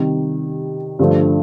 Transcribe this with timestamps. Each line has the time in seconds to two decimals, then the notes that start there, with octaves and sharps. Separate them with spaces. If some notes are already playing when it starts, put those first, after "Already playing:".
Already playing: C3 D#3 G3
0.99 G2 D3 F3 A3